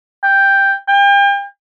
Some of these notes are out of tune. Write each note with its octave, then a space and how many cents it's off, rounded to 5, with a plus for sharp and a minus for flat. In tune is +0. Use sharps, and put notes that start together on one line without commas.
G5 +5
G5 +40